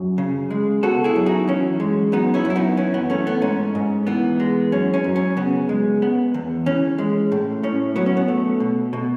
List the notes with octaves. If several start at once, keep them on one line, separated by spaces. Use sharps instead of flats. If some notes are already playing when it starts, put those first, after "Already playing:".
Already playing: F#2
C#3
G#3
B3 F#4 A4
E4 G#4
F#2
D#4 F#4
E3 C#4
G#3
F#2 B3 D#4
C#4 E4
F#2
E4
B3 D#4
E3 C#4
B3
A3 C#4
B3
G#2 C#4
G#2
E3 B3
G#3
F#2 C#4
C#4
F#2
C#4
C#3 B3
G#3
B3
E2
E3 C#4
G#3
A2
A2 C#4
F#3 B3
C#4
B3
A3
B2
B2